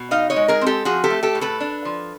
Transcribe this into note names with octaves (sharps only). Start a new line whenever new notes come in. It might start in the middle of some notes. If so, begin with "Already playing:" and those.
Already playing: B2
D#4 D#5 F5
C#5 D#5
G#3
G#4 A#4
C4
G4 A4
F3 F#4 G#4
G4 A4
A3
G4 A4
A2
A4 B4
D4
F3